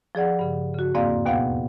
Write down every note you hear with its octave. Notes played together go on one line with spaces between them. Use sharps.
F3 G#4 D5 F#5
G2 C#3
C#3 F#4
E2 G#2 A#3 C4 D5 F5
D#2 B2 B3 F5 F#5